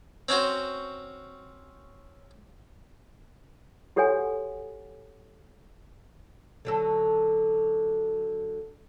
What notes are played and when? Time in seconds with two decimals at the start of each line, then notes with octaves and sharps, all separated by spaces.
0.29 C4 C#4 F#4 C5
3.96 F#4 G4 A4 C#5 F#5 G#5
6.65 D3 F#3 A4